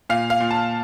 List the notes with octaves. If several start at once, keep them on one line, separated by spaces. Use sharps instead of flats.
A#2 F5
F5
A#2
A5